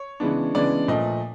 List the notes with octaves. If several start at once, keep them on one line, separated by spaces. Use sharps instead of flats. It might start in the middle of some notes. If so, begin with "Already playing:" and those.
Already playing: C#5
C#3 E3 G#3 B3 D4
C#3 E3 G#3 B3 D4 D5
A#2 F3 A3 D#5